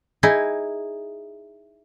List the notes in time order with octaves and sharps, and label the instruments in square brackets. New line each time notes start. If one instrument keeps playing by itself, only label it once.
[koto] D#4 E4 G#4